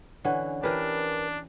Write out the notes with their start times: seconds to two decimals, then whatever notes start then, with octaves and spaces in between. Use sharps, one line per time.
0.25 D3 E3 C#4 F#5
0.63 E3 D4 G4 A#4 B4